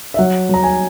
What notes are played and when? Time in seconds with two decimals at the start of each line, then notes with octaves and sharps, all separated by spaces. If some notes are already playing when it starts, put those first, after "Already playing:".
0.14 E5
0.18 F#3 F#5
0.49 F#3 A#5
0.63 G#5